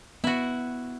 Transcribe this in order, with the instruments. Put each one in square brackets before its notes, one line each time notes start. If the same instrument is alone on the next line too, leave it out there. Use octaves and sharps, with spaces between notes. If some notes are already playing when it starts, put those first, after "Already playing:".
[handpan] B3 [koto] E4 F#4